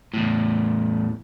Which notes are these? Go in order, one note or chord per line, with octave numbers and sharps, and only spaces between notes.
E2 A2